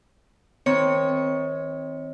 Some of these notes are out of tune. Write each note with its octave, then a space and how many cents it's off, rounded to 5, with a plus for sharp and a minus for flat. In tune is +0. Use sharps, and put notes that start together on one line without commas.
D#3 +35 C4 +0 C#5 +0